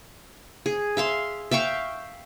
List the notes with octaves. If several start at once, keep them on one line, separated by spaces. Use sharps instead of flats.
G#4
E5 F5 C6
E5 F5 G5 C#6